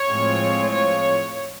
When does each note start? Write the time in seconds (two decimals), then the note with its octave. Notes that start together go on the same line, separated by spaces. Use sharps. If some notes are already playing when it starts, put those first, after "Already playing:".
Already playing: C#5
0.09 A2 F3 G#3 C4 F4
0.72 C#5